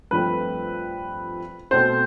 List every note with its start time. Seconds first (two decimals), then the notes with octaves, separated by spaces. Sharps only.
0.11 G2 F3 A3 C4 B4
1.71 B2 A3 C4 C5